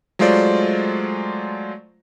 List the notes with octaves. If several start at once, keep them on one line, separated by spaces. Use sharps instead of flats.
F#3 G#3 A3 F4 C5 D5